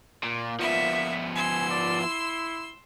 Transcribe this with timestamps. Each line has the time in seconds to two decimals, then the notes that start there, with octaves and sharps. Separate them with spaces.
0.24 A#2 A#3
0.60 F3 B3 E5
1.35 G#5 C6 E6
1.70 D5
2.01 E4